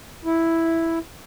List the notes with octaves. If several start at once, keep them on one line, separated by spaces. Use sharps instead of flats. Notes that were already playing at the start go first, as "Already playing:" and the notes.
E4